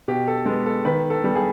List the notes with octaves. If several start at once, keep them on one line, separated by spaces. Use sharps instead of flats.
B2 G4
A4
G#3 B3 A4
A4
D#3 B4
A4
G3 B3
G#4